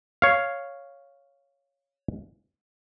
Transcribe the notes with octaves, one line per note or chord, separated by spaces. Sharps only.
C#5 F5